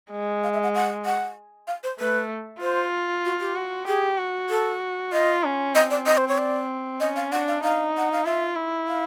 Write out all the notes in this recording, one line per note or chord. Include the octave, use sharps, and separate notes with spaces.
G#3
F5
E5
F#5
F#5
F#5
F5
C5
A3 B4
F4 C5
F#4
G4
F#4
G4 G#4
F#4
A4
F4 D#5
C#4
C4 D#5
D5
D#5
C5
C#5
D5
C#4 D#5
F5
D4 F#5
F5
D#4 F5
F#5
F5
F4 E5
E4
F5